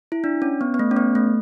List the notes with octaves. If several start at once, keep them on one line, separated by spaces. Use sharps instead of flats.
E4
D4
C#4
B3
B3
A3
C#4
B3
A3